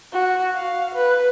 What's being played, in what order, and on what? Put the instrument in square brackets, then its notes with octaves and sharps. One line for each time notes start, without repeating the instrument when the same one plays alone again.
[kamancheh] F#4
F5
B4